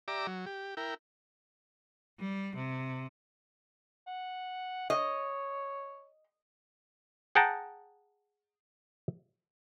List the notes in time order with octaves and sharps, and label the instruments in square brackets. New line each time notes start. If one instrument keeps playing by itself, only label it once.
[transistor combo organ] G4 D5 E5 A#5 D6
F#3
G4
E4 A#4 G5
[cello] G3
C3
[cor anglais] F#5
[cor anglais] C#5 [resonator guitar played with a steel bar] D#5
[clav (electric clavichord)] G#4 F#5 G5 A5 A#5